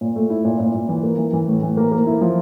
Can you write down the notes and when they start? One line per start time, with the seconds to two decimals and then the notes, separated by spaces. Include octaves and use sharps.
0.01 A#2
0.16 A3
0.30 E4
0.45 A#2
0.60 A#2
0.74 A#2
0.89 E3
1.03 A#3
1.18 E3
1.33 E3
1.48 A2
1.63 E3
1.77 A#3
1.92 A#3
2.07 E4
2.21 F3